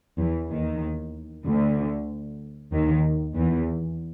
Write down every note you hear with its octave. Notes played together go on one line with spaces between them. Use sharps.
E2 E3
D#2 D#3
D2 D3
D#2 D#3
E2 E3